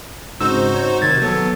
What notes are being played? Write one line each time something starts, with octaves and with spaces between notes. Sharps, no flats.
G#2 C#3 C4 D#4 F#4 C5 E6
C#5
C3 D#3 G#6 A6
F#3 B3 A4 E6